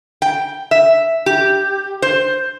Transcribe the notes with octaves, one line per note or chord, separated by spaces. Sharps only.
G5
E5
G4
C5